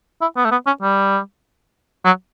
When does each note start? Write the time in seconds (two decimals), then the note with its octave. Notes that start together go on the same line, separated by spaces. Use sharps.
0.21 E4
0.36 B3
0.45 A3
0.51 B3
0.67 C#4
0.82 G3
2.05 F#3